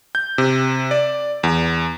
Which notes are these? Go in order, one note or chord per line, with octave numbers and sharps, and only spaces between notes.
G6
C3
D5
E2